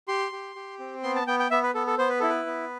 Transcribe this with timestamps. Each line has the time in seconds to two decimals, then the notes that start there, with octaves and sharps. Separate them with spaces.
0.08 G4 C6
0.32 G4
0.56 G4
0.79 C4
1.03 B3 C6
1.15 A5
1.27 B3 G5
1.39 G5
1.51 B3 E5
1.63 B4
1.75 B3 A4
1.87 A4
1.98 B3 C5
2.09 B4
2.20 E4 A4
2.29 B4
2.46 B3